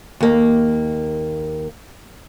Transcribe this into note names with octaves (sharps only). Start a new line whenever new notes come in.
D#2 A#3